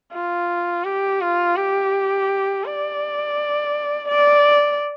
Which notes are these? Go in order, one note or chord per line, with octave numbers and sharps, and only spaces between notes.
F4
G4
F4
G4
D5
D5